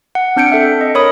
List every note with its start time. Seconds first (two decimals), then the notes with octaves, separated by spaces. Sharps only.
0.15 F#5
0.36 C4 D4 G6 C#7 D7
0.52 A4 E5
0.81 D#5
0.95 A#4 C#5 B5 D#6